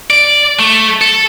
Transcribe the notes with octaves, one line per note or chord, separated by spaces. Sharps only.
D5
A3
A4